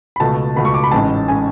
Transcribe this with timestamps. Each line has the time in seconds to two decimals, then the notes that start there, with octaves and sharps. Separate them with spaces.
0.16 B5
0.20 C#2 B2 A3 A5
0.56 C#2 B2 A3 B5
0.65 C#6
0.74 D6
0.84 B5
0.91 A1 G#2 G#3 C#4 A5
1.28 G#3 C#4 G#5